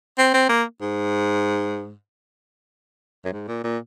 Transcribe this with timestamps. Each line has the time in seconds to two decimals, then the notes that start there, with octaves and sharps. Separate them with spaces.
0.18 C4
0.34 C4
0.49 A#3
0.81 G#2
3.25 F#2
3.32 G#2
3.48 A#2
3.64 A#2